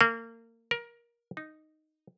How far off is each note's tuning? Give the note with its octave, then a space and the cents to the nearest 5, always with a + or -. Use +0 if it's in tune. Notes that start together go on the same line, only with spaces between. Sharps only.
A#3 -30
A#4 +20
D#4 -5